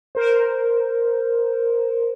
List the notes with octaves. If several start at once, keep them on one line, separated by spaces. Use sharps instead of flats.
A#4 C5